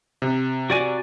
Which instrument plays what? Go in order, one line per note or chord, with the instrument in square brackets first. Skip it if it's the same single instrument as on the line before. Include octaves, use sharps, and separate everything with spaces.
[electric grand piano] C3
[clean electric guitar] F#4 D5 G#5